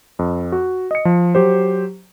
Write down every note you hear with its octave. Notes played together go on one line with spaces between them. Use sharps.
F2
F#4
D#5 C#7
F3
F#3 G4 C5